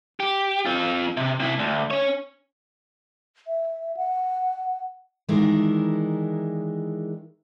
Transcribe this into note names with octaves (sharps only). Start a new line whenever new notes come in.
G4
C4 F4
C3
C3 E4
D2
C#4 C#5
E5
F#5
D#3 E3 G#3 D4 E4 A#4